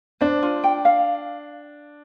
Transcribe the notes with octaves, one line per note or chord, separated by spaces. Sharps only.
D4 C5
F4
G5
F5